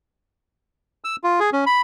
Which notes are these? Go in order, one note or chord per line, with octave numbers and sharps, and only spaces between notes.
E6
F4
G#4
C#4
B5